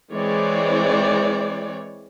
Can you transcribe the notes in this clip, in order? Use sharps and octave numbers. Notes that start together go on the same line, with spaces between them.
E3 G#3 C4 C#5 D5